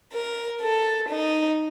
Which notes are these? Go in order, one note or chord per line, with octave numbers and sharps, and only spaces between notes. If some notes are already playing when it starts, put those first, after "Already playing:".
A#4
A4
D#4